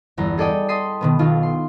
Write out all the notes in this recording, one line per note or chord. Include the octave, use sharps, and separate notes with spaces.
G1 E2 A#5
G#4 A4 D5 D#5 G5
D#5 A5 C6 D#6 B6 C7
B2 D#3 B3
B1 D#3 F4
C6